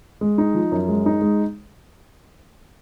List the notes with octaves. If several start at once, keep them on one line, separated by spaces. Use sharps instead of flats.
G#3
D#4
F3
F#2
G#3
D#4
G#3